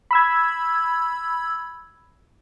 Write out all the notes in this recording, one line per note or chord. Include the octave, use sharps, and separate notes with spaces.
B5 E6 G#6